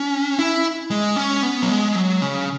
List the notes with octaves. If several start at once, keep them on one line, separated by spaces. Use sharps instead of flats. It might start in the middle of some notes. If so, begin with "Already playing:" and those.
Already playing: C#4
E4
G#3
C#4
B3
F#3
G#3
F#3
C#3